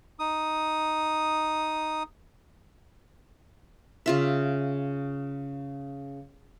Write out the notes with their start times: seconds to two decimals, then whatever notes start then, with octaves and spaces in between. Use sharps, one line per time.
0.19 D#4 D#6
4.06 C#3 F4 E5